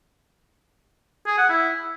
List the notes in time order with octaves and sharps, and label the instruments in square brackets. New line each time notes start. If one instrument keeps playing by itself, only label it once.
[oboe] G#4
F#5
E4